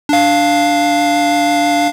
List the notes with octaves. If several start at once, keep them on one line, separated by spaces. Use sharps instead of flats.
D4 F5